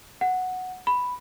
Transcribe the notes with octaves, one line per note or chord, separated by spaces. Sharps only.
F#5
B5